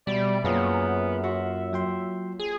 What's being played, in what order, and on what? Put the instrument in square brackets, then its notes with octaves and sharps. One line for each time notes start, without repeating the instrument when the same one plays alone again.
[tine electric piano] B2 [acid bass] G3 [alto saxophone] D5 [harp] E5 B5
[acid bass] F#2 [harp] A#3 F4 C#5 [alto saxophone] B3 [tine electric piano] G#4 F5 A#5
[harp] F4 F#4 F#5 [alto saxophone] E5
[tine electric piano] F#3 G5 C6
[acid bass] G#4